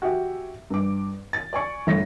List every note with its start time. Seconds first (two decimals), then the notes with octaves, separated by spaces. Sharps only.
0.02 F#4 G4 E5 G#5
0.70 G2 D6
1.33 A6
1.53 D5 G#5 C#6
1.87 G1 A3 A#6